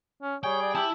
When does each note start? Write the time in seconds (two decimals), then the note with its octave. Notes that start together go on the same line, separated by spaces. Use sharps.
0.22 C#4
0.43 G3 G#4 C#5 G5 G#5
0.62 D5
0.75 E4 G4 A5 E6